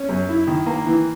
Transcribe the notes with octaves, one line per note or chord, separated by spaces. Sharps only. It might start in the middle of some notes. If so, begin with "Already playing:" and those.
Already playing: C#4
F#2
E4
D#3
A#3
E3